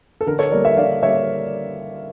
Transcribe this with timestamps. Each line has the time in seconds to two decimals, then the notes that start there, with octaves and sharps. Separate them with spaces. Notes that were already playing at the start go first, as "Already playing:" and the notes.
0.21 A4
0.27 D3 A#4
0.39 A4 C#5
0.52 G3 A#3 A#4 D5
0.65 C#5 E5
0.77 D3 D5 F5
1.02 G3 A#3 C#5 E5